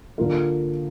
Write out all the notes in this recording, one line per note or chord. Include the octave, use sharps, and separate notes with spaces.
D3 A#3 F4 A#4